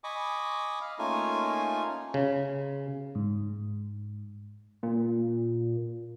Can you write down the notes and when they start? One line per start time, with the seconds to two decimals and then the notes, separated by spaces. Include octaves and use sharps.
0.04 D#5 G#5 B5 C#6 D6
0.81 F5
0.99 A3 A#3 C#4 D#4 F4 G#5
2.14 C#3
3.15 G#2
4.83 A#2